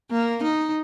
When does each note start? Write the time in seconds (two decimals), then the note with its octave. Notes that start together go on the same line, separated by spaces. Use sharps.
0.11 A#3
0.43 D#4